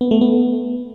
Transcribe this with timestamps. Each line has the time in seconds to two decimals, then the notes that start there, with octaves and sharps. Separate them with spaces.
0.01 B3
0.11 A3
0.21 B3